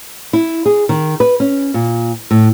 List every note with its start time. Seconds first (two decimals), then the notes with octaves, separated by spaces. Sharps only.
0.33 E4
0.66 G#4
0.89 D#3
1.20 B4
1.40 C#4
1.74 A#2
2.31 A2